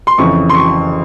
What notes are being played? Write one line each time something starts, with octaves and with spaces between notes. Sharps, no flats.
C6
F2 C#3 E3 C#6
C6
C#6